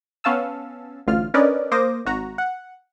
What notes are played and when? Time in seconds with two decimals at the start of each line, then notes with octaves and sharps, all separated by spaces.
0.24 B3 C#4 F5 A5 E6
1.07 A1 D2 F4 F6
1.34 C#4 D4 A#4 B4 D5 D#5
1.71 A#3 C5 D6 D#6 A#6
2.06 G#1 F#4 A#5
2.38 F#5